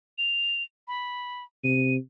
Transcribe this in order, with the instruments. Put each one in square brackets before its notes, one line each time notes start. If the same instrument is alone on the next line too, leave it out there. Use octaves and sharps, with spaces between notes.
[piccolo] F7
B5
[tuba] C3 [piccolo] D#7